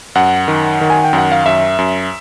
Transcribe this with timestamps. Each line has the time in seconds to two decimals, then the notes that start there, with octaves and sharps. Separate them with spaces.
0.15 F#2 F#5
0.48 D#3
0.81 D#3
0.90 G#5
1.04 G5
1.13 F#2
1.18 F#5
1.32 F5
1.45 F#2 E5
1.79 F#2